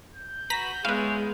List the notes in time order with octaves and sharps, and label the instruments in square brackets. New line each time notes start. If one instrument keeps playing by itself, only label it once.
[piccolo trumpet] G6
[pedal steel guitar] F#4 B4 [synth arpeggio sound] A#5 A#6 B6
[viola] G#3 B3 [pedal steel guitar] E4 G#4 C#5 [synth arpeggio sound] B4 F5